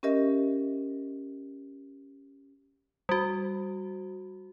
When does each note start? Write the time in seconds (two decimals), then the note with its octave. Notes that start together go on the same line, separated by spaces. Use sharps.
0.03 C#4 G4 A#4 D#5 E5
3.09 G3 F#4